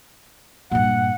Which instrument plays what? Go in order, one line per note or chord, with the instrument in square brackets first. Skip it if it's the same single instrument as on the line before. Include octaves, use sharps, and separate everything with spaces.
[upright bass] G2 A#2 [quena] F#5